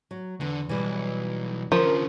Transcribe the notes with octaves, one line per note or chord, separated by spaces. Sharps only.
F#3
E2 D3
B1 E3 G3
D3 F3 C#4 A#4